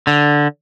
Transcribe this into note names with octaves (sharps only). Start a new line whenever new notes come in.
D3